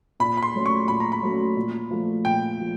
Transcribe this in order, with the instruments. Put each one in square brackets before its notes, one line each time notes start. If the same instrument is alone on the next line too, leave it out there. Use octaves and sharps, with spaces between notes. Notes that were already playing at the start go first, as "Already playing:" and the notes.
[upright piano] A#2 [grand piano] B5
[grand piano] B5
C6
[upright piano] F#3 A3 C#4
[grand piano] C#6
[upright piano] A#2 [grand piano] B5
[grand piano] A#5
B5
[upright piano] F#3 A3 C#4
A#2
F3 A3
[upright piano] A#2 [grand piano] G5
[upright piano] F3 A3